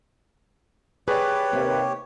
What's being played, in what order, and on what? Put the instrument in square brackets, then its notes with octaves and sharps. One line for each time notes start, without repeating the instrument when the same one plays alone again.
[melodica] G4 C#5 [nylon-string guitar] G#4 [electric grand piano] B4 D5
[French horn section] D#2 C3 [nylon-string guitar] A#3